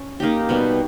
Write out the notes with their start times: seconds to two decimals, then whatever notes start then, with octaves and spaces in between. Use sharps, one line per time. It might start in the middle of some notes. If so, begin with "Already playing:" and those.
Already playing: C#4
0.20 A#3 D#4 G4
0.49 B2 G3 B3